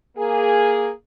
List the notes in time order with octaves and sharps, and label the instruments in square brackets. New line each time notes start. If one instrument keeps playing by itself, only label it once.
[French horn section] A#3 G#4